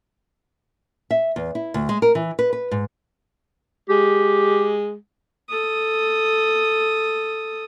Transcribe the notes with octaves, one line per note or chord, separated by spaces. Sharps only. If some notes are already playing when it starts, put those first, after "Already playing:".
E5
E2
E4
D2
G#3
A#4
E3
B4
B4
G#2
G#3 G4
A4 D#6